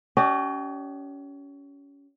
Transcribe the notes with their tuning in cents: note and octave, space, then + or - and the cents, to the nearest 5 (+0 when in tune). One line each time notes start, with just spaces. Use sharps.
C#4 +25 G4 -35 D#5 -40